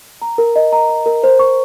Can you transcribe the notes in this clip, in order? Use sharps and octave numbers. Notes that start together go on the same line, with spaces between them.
A#5
A#4
D#5
A#5
A#5
A#4
C5
C#6